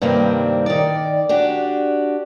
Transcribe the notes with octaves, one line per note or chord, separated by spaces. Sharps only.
G2 C3 D#3 G3 A#3 C4
D#3 D5
D4 F#4 G4